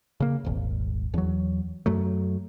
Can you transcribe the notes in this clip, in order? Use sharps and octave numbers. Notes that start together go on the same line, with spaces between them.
C#3 A#3
D#1 G#1
E2 F#3
F#2 F#3 A3